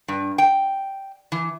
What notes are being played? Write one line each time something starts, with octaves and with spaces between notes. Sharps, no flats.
G2
G5
E3